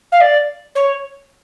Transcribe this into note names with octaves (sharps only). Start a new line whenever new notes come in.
F5
D5
C#5